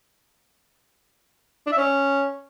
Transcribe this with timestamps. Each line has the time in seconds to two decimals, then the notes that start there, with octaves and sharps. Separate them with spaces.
1.67 D4
1.72 E5
1.77 C#4